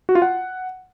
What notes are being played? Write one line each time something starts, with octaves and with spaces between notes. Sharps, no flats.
F#4
F4
F#5